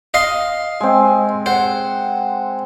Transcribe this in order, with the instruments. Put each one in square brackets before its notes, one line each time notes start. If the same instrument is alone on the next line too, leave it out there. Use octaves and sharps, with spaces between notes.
[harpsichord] D#5 F5 C6
[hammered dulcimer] G#3 C4
[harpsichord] C5 [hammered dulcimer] F#5